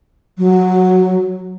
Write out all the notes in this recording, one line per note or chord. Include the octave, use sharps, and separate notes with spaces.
F#3